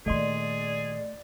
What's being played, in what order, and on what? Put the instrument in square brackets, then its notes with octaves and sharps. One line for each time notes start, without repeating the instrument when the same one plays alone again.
[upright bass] A#2 D#3 [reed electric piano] A3 D#5 C6 [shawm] G#4 [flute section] D5